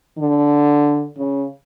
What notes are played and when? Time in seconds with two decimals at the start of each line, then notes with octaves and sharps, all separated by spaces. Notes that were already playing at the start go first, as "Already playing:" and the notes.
0.18 D3
1.17 C#3